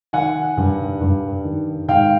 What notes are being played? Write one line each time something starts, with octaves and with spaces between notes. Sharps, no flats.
D#3 F#5 G#5
G2
G2
D#3
G#2 F5 G5